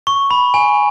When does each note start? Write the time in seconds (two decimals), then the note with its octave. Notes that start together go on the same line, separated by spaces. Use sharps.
0.07 C#6
0.31 B5
0.54 G#5